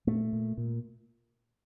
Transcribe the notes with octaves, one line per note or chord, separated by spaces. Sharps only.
A#2 A3
A#2
A#2